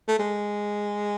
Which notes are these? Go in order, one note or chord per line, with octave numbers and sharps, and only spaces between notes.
A3
G#3